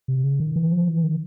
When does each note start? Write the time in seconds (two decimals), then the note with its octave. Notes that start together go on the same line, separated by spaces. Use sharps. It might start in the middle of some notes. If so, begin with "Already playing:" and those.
0.08 C3
0.24 C#3
0.40 D#3
0.56 E3
0.72 F3
0.88 E3
1.04 D#3